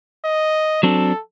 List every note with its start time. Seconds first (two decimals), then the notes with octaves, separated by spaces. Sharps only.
0.25 D#5
0.83 F#3 C4 D4 A4